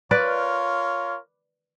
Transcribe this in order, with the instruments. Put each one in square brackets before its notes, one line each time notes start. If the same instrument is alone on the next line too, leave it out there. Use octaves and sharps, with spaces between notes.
[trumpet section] F4 A#4 C#5 [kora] B4 D5